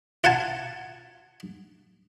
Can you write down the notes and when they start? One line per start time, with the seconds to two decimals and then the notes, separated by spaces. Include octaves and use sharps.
0.24 F4 F#5 G#5 A5